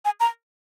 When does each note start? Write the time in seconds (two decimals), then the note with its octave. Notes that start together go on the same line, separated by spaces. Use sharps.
0.05 G#5
0.20 A#5